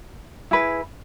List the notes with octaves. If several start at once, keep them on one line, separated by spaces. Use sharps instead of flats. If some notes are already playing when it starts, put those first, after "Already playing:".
E4 G#4 B4